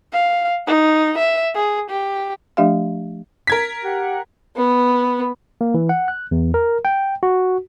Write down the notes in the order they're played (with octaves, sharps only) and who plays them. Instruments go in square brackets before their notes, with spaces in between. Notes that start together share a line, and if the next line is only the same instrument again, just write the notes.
[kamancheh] F5
D#4
E5
G#4
G4
[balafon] F3 A3 D4 G4 E5 F5
[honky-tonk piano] A#4 G#6 B6
[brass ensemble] G4 F#5
[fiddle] B3
[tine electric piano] A#3
E3
F#5
F#6
E2
A#4
G5
F#4